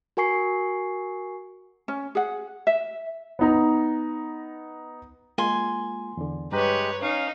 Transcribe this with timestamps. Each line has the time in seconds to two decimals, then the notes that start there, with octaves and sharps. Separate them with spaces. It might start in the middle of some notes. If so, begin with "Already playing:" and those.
0.17 F#4 A#4 G#5 C#6 C7
1.88 C#4
2.15 G#4 F#5
2.67 E5
3.39 B3 D#4 A#5
5.38 G#3 A#3 F4 G#5 C6
6.17 E2 D3
6.52 G2 G#3 G4 B4 C#5 A#5 F#6
7.02 C#4 D#4 F5